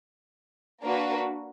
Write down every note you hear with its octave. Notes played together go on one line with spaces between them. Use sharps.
A#3 D4 F#4 B4